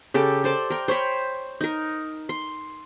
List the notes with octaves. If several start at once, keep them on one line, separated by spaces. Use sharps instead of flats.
C#3 G4 A4
A4 C5 D5
A#4 G5
C5 C#5 G5 B5
D#4 A#4
C6